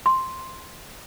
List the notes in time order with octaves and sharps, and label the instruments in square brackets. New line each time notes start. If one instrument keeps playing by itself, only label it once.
[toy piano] C6